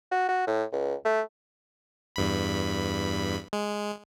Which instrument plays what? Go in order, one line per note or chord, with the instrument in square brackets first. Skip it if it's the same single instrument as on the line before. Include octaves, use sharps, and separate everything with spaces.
[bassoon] F#4
F#4
A2
C#2
A3
[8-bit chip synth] E2 G2 B5
G#3